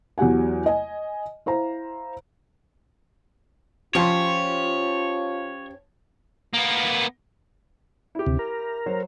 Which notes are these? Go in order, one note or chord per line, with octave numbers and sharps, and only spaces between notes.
E2 F#3 G4 F#5 G#5
D#5 G#5
E4 C5 F5 A#5
F3 C#4 F4 G4 C5 C#5 C6
A#3 B3
E4 G4
D2 C3
A#4
F#3 C5 C#5